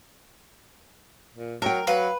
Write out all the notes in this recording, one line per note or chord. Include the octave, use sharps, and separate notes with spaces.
A#2
F#3 A#4 G5 A5
F#3 B4 F5